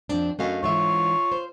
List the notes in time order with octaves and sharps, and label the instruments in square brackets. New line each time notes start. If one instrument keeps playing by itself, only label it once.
[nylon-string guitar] F2 C4 D4
[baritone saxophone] F#2 [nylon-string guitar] A3 D#5 F5
[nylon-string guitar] G#2 E3 E5 [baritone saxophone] F4 [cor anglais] C#5
[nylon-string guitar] C5